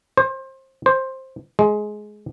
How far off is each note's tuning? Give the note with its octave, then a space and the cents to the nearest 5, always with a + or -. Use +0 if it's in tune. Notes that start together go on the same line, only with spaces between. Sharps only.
C5 +25
C5 +10
G#3 +15